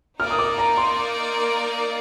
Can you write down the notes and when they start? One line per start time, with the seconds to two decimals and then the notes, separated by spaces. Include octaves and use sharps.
0.19 A#3 D#4 A#4 D5 F6
0.31 D#6
0.39 D6
0.58 A#5
0.77 C6